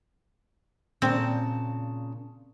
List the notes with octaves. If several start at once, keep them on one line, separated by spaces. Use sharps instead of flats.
A#2 C#3 C4 A5